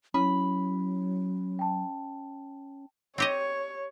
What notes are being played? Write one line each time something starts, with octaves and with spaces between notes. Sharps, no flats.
F#3 C#4 E4 B5 D#6
G5 A5
C4 G4 C#5 D#5